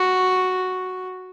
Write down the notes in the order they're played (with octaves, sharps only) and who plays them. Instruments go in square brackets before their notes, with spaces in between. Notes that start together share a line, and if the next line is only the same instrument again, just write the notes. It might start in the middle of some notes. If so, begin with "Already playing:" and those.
Already playing: [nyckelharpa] F#4